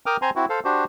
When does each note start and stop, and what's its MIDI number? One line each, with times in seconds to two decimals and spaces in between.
0.06 0.17 70
0.06 0.17 79
0.06 0.17 86
0.06 0.17 87
0.06 0.17 89
0.22 0.30 60
0.22 0.30 72
0.22 0.30 80
0.22 0.30 82
0.22 0.30 84
0.36 0.46 60
0.36 0.46 64
0.36 0.46 66
0.49 0.60 69
0.49 0.60 72
0.49 0.60 77
0.65 0.85 62
0.65 0.85 66
0.65 0.85 67
0.65 0.85 72